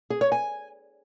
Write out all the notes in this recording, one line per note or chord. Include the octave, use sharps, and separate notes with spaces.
G#4
C#5
G#5